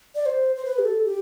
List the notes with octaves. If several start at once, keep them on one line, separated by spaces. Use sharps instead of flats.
D5
C5
C5
B4
G4
A4
G4